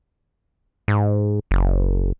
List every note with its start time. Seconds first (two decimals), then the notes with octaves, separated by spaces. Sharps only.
0.88 G#2
1.51 F#1